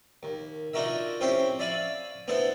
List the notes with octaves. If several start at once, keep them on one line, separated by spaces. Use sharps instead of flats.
D#2
D4 D#4 F4 F#4 A#4 E5
C4 C#4 E4 G4 C5
D5 E5 F5 G#5 B5 C#6
B3 D4 E4 A4 C5